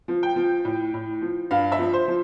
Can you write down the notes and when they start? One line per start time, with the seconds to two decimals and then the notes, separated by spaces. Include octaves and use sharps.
0.08 F3
0.23 G5
0.36 F3
0.65 A2
0.94 A2
1.22 F3
1.51 G2 F5
1.72 E5
1.79 F3
1.93 C5
2.08 F3